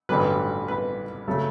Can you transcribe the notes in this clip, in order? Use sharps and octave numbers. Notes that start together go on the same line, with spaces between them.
A1 G2 D3 F#3 B4
B4
C#3 F#3 A3